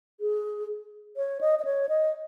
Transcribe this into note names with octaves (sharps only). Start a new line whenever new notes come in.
G#4
C#5
D#5
D#5
C#5
D#5